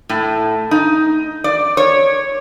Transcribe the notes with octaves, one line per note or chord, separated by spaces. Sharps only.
A2
D#4
D5
C#5